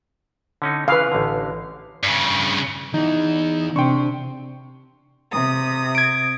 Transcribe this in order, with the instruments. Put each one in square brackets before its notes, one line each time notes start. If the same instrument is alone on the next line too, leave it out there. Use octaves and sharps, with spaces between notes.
[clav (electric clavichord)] D3 C#4 D#4
[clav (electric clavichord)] C#3 E3 [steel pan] B4 F5
[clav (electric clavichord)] A1 D3
[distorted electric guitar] G2 C#3
[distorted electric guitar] E2 E4 [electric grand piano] D#4
[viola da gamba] C3 [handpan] D4 [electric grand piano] G5 C6 C#6
[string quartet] C3 D#6
[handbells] G#6 D7